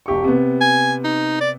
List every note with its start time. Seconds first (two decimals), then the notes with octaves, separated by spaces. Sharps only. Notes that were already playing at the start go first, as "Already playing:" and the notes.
0.06 E1 G4 C#6
0.24 C3 B3
0.61 G#5
1.04 D#4
1.41 D5